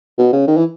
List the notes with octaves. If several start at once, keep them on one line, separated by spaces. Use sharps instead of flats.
B2
C#3
D#3
E3